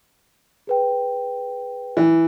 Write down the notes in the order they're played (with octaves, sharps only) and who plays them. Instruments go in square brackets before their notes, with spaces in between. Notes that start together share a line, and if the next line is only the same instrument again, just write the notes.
[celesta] G#4 B4 G5
[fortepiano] E3